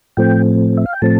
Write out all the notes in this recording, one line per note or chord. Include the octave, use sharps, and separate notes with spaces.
A2 F3 A3 C4 G5
E5
F5
G5
A2 F3 A3 C4 A5